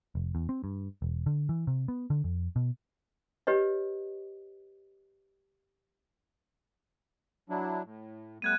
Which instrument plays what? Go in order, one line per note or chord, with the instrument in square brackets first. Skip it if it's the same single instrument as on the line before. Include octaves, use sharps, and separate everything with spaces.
[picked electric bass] F1
E2
C4
G2
E1
D3
E3
C3
B3
D3
F2
B2
[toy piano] G4 B4 C#5 D#5
[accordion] F#3 D4 E4
A2
[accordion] G3 A3 B3 [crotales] F#6 G#6 D#7